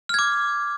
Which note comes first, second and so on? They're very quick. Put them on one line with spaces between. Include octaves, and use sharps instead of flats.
F6 G#6 D6